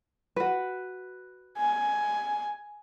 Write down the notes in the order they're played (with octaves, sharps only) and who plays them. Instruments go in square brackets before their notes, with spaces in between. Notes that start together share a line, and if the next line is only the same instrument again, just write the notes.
[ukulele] F#4 B4
[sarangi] G#5